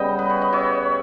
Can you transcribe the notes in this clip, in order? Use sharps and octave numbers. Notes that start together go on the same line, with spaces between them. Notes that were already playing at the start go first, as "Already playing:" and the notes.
Already playing: C#3 G3 B3 D#5 G5
B4
C#5
D#5
C#5 E5